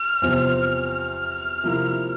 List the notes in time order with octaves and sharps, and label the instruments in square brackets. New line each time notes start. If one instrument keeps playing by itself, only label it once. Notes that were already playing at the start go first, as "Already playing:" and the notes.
Already playing: [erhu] F6
[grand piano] E2 C3 F3 C4
[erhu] F6
[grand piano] C3 F3 A#3 E4